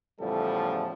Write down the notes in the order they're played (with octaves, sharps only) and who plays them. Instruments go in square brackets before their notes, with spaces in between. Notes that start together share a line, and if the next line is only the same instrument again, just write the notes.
[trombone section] E2 A2 C#3 F3 G3 A4